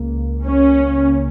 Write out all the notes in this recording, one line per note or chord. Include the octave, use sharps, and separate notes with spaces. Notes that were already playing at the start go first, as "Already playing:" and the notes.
Already playing: C#2 C#3 A#3
C#2
C#2 C#4
A#3
C#3